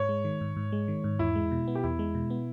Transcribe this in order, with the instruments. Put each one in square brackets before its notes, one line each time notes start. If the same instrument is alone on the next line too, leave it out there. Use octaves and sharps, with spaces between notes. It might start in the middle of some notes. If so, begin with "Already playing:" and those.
Already playing: [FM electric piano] G#2 [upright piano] C#5
[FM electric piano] G#3
D#3
G#2
G#2
G#3
D#3
G#2
[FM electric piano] E2 [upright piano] E4
[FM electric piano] G#3
B2
B3
[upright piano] G4
[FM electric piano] E2 [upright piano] E4
[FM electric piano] G#3
B2
B3